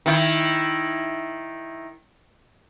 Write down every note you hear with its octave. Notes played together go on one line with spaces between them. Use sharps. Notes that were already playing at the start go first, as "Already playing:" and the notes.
D#3 E4